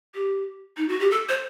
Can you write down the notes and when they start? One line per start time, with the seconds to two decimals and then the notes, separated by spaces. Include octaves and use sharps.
0.14 G4
0.77 D#4
0.88 F#4
1.00 G4
1.11 A4
1.29 C5